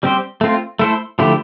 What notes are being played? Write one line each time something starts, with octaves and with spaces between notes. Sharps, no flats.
G3 C4 G4 C5
A3 C4 F4
A3 E4 A4 C5
D3 F3 A3 E4 G4